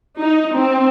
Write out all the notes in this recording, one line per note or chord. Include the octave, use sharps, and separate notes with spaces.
D#4
C4